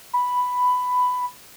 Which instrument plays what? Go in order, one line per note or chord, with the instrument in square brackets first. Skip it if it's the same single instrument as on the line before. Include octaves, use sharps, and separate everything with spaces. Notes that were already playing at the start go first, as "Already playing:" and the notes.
[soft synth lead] B5